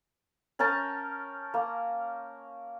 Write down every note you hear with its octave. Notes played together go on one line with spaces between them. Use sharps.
C#4 A#4 G5 A5
A#3